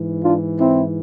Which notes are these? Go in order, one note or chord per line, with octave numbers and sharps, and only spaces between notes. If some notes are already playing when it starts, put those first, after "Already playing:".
Already playing: G#2 E3
D4 F4
C4 E4